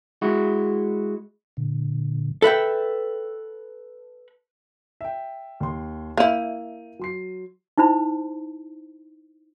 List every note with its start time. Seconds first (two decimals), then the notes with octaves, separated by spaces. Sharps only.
0.22 G#3 E4 F#4
1.57 A#2 D3
2.42 A4 B4 E5 G5
5.01 E5 G5
5.60 D#2 C6
6.18 A#3 E4 G6 D#7 F7
6.99 F#3 C6 C7
7.78 D#4 E4 C5 B5